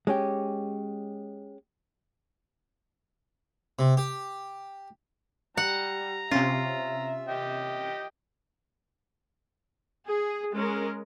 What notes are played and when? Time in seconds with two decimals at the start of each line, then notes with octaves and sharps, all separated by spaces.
0.07 G#3 C#4 G4
3.79 C3
3.97 G4
5.57 G3 F#5 A#5
6.31 C3 C#4 F4 E5
7.28 G4 D#5 G5
10.07 G#4
10.54 G#3 C#4 A#4